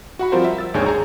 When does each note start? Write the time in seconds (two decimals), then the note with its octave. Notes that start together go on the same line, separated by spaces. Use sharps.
0.19 F#4 F#5 B5
0.32 F3 G3 C4 F4 A#4 C5
0.44 E5
0.58 E6 A6
0.74 G#1 D#2 D4 G#4 C#5 G6
0.86 G#4 A#5